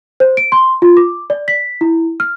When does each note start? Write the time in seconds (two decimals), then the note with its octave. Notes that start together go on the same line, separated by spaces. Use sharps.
0.20 C5
0.37 D7
0.52 C6
0.82 F4
0.97 D6
1.30 D5
1.48 B6
1.81 E4
2.20 F6